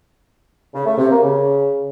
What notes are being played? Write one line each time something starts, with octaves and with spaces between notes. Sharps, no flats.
C#3
A3
C3
A#3
C#3